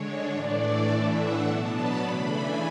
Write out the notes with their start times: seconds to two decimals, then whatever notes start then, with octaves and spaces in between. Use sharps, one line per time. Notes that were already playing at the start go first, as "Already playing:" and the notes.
Already playing: D3 G#3 D4 C#5
0.30 A2 E3 A3 D4 D5
0.88 A2 E3 A3 D4 E5
1.17 F#5
1.46 B2 F#3 B3 D4 A5
1.74 B5
2.03 C#3 E3 A3 D4 B5
2.32 G#5